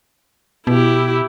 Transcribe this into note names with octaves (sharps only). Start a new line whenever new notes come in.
B2 E4 G4